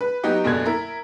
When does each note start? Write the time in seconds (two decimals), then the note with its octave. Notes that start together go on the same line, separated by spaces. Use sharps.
0.01 B4
0.24 F#3 B3 D#4 F#4 G4
0.44 F#1 B2 D3 G#6
0.66 E4 A#4